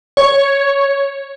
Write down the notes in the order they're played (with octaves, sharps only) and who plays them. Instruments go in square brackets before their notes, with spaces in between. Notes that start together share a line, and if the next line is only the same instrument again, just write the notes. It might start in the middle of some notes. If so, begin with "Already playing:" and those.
[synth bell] C#5